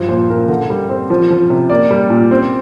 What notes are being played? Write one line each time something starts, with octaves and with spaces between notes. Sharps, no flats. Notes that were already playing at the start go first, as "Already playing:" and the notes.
Already playing: G2 F3
A#2 C5
A#2 A#4
D3 A#4
G3
C4
F3
F3
C3
A#3 D5
G3
A#2
C4